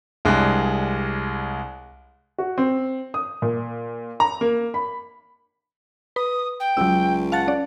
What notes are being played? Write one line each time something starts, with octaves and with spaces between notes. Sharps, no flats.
C2 G#3 D4 F#6
F#4
C4
D#6
A#2
A#5
A#3
B5
B4 D#6
G5
C#2 F#3 E6
F5 F#5 A5 A6
C#4 D5